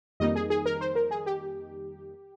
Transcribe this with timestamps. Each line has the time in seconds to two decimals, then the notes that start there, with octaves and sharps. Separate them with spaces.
0.20 F2 D#3 G3 A#3 D#4 D#5
0.35 G#4
0.50 G#4
0.66 A#4
0.81 C5
0.96 A#4
1.11 G#4
1.26 G4